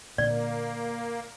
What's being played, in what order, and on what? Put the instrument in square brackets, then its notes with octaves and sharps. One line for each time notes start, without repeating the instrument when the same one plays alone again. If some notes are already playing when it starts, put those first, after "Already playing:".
[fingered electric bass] A#2 D3 [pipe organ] A#3 [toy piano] D5